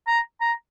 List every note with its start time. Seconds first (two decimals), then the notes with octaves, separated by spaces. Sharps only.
0.07 A#5
0.41 A#5